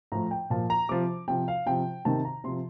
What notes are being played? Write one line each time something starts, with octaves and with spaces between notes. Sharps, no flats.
A2 F3 A#5
G5
A#2 F3 A5
A#5
C3 F3 D6
C3 F3 G5
F5
C3 F3 G5
C3 D#3 A5
A#5
C3 F3 C6